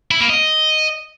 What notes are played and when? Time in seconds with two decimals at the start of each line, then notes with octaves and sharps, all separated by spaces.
0.11 E4
0.20 A#3
0.30 D#5